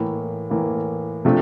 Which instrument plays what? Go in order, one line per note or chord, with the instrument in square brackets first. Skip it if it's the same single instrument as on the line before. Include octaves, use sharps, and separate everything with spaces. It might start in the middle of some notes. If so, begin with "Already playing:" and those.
Already playing: [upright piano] A2 E3 A#3
A2 E3 A#3
C3 F3 A3 D4